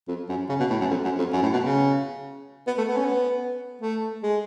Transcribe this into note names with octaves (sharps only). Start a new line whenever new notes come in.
F2
F#2
C#3
B2
A2
F#2
F2
F#2
F2
F#2
A2
B2
C#3
B3
A3
B3
C#4
B3
A3
G#3